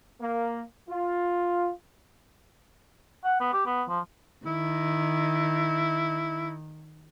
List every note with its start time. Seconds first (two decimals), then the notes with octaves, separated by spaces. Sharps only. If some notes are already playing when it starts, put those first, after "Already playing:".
0.20 A#3
0.89 F4
3.24 F#5
3.40 B3
3.53 G4
3.66 B3
3.89 F3
4.46 D#3 E4